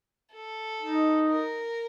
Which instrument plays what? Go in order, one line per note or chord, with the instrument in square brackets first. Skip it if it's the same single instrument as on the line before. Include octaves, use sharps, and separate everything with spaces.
[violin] A4
[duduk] D#4
[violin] A#4